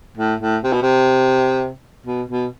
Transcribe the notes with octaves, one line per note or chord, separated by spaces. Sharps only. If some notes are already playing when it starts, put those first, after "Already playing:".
A2
A2
C3
B2
C3
B2
B2